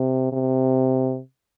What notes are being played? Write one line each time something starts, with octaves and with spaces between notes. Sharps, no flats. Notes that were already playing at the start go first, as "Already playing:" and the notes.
Already playing: C3
C3